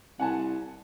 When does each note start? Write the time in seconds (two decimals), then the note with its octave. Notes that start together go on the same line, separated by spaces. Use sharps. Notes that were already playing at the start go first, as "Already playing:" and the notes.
0.20 C2 F#5 G#5 A5